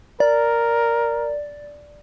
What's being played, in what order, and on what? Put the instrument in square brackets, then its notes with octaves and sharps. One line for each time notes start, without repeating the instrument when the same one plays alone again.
[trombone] A#4 [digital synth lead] D5